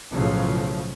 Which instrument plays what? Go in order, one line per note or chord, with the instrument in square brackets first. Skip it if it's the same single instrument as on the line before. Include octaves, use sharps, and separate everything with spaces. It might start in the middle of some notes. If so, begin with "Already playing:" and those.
[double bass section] B1 A2 C#3 F3 F#3